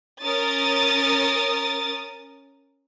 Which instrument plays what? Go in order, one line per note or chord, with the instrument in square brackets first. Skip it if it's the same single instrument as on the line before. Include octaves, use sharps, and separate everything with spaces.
[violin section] C#4 A#4 D#6 A6